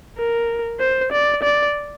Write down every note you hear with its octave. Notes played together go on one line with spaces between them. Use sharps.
A#4
C5
D5
D5